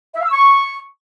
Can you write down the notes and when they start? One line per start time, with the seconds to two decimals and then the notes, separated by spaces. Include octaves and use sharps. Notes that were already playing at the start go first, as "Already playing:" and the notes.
0.15 E5
0.21 F5
0.26 E6
0.32 C#6